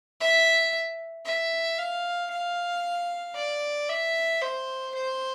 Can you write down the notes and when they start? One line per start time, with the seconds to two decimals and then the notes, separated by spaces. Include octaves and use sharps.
0.20 E5
1.25 E5
1.78 F5
2.31 F5
3.35 D5
3.89 E5
4.41 C5
4.94 C5